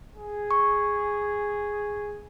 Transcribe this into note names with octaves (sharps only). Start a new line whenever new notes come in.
G#4
C#6